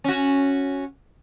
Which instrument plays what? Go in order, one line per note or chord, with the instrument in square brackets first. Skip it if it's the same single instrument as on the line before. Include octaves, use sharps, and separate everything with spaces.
[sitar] C#4 F#4